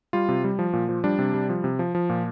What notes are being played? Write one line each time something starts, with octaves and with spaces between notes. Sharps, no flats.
G3 F4
C3
G3
F3
A#2
F3
G3 D4
C3
G3
F3
C3
F3
F3
A#2